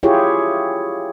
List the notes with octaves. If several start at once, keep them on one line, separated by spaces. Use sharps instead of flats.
E4 F4 G4 G#4 C#5